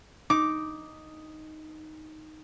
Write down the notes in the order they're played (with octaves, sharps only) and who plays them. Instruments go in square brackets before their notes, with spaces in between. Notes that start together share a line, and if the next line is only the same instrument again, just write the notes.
[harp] D#4 [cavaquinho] D6